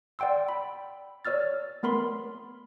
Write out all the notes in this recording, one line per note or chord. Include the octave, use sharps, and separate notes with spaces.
D5 F#5 G5 C6 E6
B5
C#5 D5 E6 F6 A6
A3 B3 A#4 B5 C6